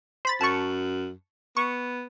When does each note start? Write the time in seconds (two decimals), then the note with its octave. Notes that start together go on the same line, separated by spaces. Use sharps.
0.25 C5 B5 A6
0.41 F#2 A5 C#6
1.57 B3 C#6